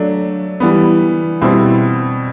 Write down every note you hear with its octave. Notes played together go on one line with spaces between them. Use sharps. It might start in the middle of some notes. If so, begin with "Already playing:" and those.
Already playing: F#3 A3 D4
E3 G3 B3
B2 G3 C4 E4